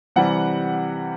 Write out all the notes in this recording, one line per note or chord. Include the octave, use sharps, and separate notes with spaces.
C3 E3 G3 F#5